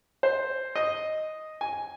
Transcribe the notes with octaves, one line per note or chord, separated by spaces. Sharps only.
C5
D#5
G#5